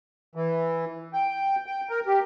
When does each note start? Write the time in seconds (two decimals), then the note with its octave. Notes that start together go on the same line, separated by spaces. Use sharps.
0.35 E3
1.13 G5
1.66 G5
1.89 A#4
2.07 G4